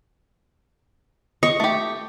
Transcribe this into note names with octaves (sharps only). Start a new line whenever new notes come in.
D#5 C#6
A3 G4